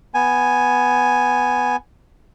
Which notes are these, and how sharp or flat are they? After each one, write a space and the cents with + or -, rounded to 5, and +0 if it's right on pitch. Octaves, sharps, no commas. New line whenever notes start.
B3 +5 G#5 +0